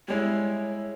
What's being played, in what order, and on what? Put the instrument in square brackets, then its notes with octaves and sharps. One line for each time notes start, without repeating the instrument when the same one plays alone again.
[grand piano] G3 G#3 E4 [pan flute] C#5